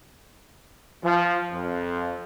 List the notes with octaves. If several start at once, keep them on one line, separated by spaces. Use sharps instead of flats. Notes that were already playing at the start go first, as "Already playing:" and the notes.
F3
F2